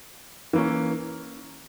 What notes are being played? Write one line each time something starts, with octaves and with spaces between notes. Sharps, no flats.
E3 A#3 C#4